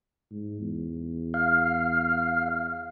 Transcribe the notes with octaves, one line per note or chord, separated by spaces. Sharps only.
G#2
E2
F5